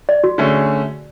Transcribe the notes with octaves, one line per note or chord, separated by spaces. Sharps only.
D5
F#4
D3 A3 C#4 G#4